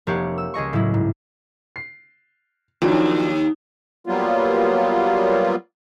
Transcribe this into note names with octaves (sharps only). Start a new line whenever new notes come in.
F1 A#3 G4 C#5 F#5
E6
C#2 G#4 D#5 C#6
A2 C#3 F#3 E4
G#2
C7
D#2 F3 F#3 D4
F#3 G3 A#3 B3 F4